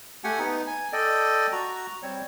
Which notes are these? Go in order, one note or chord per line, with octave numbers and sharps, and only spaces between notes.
A3 G4 F#5 G#5
B3 D#4
G#5
A4 D5 D#5 G5
F#4 A#5
G3 C4 C#5